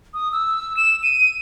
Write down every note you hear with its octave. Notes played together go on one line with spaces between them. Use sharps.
D#6
E6
E7
D#7